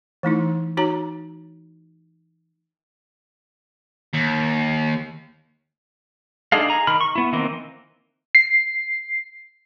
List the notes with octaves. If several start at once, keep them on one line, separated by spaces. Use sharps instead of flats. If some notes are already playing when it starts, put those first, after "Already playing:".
E3 A3 D#4 E4
D#4 F#4 C#5 A#5
D#2
D4 D#4 G#4 A4 F5
G#4 A#5
D#3 B5 F6
C#6
B3 E4
D#3 E3 A#3 C4
C7